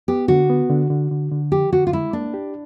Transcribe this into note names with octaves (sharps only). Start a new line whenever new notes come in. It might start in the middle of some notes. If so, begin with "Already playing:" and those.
B3 G4
D3 F#4
B3
D3
D3
D3
D3
F3 G4
D3 F#4
F4
G#3 E4
A#3 D4
G4